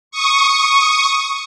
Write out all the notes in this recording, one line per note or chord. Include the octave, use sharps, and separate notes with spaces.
C#6 D#6